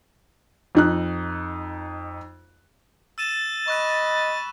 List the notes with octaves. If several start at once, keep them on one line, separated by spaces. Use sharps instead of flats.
F2 D#4 F#6
E6 A6 D#7 E7
D#5 B5 C#6 F#6 D#7